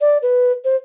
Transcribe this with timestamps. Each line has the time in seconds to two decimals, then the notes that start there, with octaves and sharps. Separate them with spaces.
0.01 D5
0.22 B4
0.64 C5